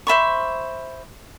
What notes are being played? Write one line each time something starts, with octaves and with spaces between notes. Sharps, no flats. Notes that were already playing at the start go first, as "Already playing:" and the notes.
C5 E5 B5 C#6